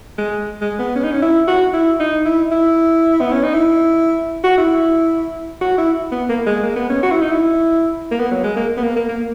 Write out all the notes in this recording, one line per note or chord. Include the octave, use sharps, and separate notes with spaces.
G#3
G#3
B3
C#4
D#4
C#4
E4
F#4
E4
D#4
E4
E4
B3
C#4
D#4
E4
F#4
E4
F#4
E4
B3
A#3
G#3
A#3
B3
C#4
F#4
E4
D#4
E4
A#3
B3
F#3
G#3
A#3
B3
A#3
A#3
A#3